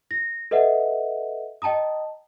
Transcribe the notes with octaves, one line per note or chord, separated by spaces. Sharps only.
A#6
A4 B4 D#5 E5 F#5
D#5 G5 A5 A#5 D#6